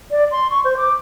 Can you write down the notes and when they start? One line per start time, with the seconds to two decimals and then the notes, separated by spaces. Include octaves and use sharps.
0.11 D5
0.31 C6
0.50 C#6
0.65 C5
0.77 D6